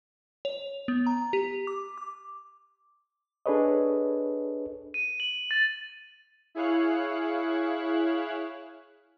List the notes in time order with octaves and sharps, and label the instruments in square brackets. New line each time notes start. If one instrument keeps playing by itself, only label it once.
[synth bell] C#5
B3
A#5
G4
D6
D6
[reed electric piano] D4 G#4 A4 B4 C#5 D#5
[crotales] D#7
F#7
A6
[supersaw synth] E4 G#4 C#5 F5 F#6